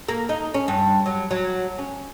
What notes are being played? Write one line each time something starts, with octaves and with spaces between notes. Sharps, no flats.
A#3
D#4
C#4
G2
F#3
F#3
C#4